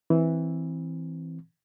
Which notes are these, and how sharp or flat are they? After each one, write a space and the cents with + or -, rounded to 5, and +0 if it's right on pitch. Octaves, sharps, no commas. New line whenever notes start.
E3 -10 C4 +0